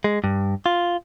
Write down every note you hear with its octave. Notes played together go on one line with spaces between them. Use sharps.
G#3
G2
F4